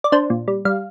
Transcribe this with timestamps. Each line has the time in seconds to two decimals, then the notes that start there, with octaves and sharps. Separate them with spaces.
0.04 D5
0.12 D4 C5
0.30 A#2
0.48 G3
0.65 G3 F5